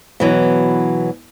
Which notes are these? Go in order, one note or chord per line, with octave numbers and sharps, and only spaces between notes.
B2 E3 F#3